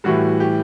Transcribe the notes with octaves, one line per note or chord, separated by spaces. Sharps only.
A2 E3 G3 F#4
G4